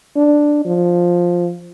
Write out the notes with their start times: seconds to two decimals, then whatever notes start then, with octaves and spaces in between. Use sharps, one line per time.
0.16 D4
0.65 F3